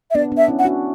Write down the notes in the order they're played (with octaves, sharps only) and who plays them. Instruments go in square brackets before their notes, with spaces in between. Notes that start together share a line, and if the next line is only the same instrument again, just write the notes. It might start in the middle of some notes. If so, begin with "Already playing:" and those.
[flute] E5
[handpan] B3 D4 [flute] D5
[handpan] B3 D4
[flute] E5
[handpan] C#4 E4
[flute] F#5
[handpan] D4 F#4